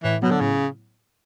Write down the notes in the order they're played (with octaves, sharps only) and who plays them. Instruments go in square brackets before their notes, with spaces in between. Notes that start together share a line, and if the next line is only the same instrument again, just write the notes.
[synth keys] A2 [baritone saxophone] E3
[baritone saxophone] B2 [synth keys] F#3 B3
[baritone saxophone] D3
[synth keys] A2 [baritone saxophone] C#3